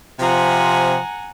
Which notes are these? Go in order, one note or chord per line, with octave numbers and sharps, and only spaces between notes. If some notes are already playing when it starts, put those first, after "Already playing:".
C3 F3 F#5 G#5 A#5